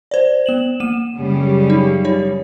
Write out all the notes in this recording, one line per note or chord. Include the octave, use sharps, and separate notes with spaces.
C5 D5
B3 E7 F#7
A#3 D#7 E7
F#2 C#3 G3
D#4
D#4 C#5